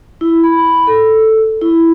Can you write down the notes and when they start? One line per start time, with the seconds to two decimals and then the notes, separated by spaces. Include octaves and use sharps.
0.21 E4
0.44 B5
0.87 A4
1.62 E4